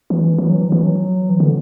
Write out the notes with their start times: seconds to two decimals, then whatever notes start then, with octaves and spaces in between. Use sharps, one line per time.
0.10 E3
0.38 E3
0.50 F#3
0.62 E3
0.72 E3
0.84 F#3
1.29 E3
1.40 D3